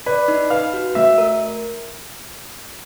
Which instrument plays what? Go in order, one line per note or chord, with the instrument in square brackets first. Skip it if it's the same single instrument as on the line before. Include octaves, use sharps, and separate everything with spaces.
[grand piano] B4 [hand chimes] D5
[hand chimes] D#4
[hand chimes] B4 [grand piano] F5
[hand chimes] F#4
[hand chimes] A3 [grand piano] E5
[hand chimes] A#4